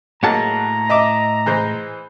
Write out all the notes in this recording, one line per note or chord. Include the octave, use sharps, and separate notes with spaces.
A2 F#3 G#3 A#3 F#5 A5 A#5
D#5 E5 D6
E3 G#3 C5